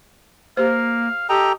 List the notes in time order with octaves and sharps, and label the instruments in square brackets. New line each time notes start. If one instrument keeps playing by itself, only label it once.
[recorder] A#3 [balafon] G4 C5 [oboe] F5
[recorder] G4 [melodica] A4 G5 A#5 [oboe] D#5